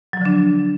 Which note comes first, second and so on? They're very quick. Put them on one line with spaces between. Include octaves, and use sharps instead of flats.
F#3 F3 D3 D4